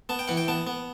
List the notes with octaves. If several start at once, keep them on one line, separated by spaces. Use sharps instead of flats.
B3 A5
G5
E3 F#5
G5
B3 A5
B3